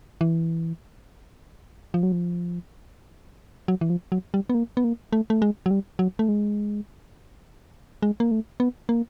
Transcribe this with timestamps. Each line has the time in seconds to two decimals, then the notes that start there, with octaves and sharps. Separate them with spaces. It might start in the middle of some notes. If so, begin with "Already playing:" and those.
0.21 E3
1.94 F3
2.03 F#3
2.12 F3
3.68 F#3
3.81 E3
3.90 F3
4.12 F#3
4.34 G3
4.50 B3
4.54 A#3
4.77 B3
4.84 A#3
5.13 A3
5.30 A3
5.42 G#3
5.66 F#3
5.71 G3
5.99 F#3
6.19 A3
6.29 G#3
8.02 G#3
8.20 A#3
8.31 A3
8.60 B3
8.89 A#3